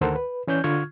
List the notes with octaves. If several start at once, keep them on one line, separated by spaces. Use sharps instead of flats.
D2 D#3 A4 A#4 C5 F#5
B4
E3 C#4 D5 G6
D3 F4 C#6 F6 G#6